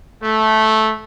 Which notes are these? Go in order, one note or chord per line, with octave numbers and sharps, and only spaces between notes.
A3